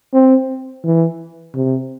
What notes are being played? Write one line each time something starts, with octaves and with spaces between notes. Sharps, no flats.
C4
E3
C3